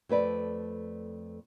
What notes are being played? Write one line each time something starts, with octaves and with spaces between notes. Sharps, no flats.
F2 A3 B4 D5